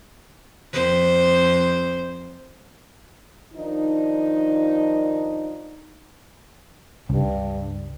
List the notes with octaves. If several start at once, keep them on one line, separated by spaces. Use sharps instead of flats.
F2 C5
D#3 F3 D4 D#4
C#2 G2